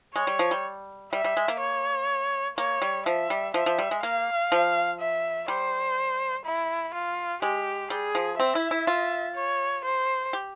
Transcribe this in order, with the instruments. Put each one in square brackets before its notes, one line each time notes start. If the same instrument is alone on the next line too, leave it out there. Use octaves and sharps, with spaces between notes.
[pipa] G#3 [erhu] C#5
[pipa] G3
F3
G3
[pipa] G3 [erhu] E5
[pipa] G3
G#3
A#3
[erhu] C#5
[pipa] A#3 [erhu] C#5
[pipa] G3
[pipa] F3 [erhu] E5
[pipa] G3
[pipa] F3 [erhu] E5
[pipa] F3
G3
G#3
[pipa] A#3 [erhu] F5
[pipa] F3
[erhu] E5
[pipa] G3 [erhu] C5
[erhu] E4
F4
[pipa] G#3 [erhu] G4
[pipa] G3 [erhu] G#4
[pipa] F3
[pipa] C4 [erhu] E5
[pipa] E4
E4
F4
[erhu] C#5
C5
[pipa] G4